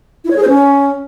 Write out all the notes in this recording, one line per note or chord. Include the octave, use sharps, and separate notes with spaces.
E4
C#5
G#4
C5
C#4